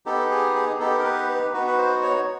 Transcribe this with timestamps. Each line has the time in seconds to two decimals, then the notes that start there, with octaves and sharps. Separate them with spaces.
0.06 B3 D#4 G4 A4
0.31 G#4
0.55 G#4
0.79 B3 D#4 G4 A4
0.99 A#4
1.04 B4
1.29 B4
1.54 B3 D#4 F#4 B4
1.67 B4
1.78 C5
2.03 C#5